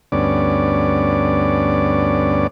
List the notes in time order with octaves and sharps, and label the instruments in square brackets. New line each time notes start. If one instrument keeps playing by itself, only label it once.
[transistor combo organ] D2 G2 B3 C#4 D5